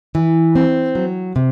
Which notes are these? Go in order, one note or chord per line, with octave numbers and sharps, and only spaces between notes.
E3
C4
F#3
C3